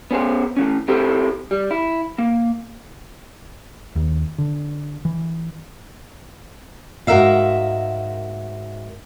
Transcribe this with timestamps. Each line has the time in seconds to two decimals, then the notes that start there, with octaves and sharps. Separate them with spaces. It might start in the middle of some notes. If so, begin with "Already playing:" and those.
0.11 B3 C#4 G#4 C5
0.57 A2 E3 C#4
0.88 C4 E4 G4 A4 C5
1.51 G3
1.71 E4
2.18 A#3
3.96 D#2
4.38 D3
5.05 E3
7.07 G#2 F#4 A#4 B4 E5 F5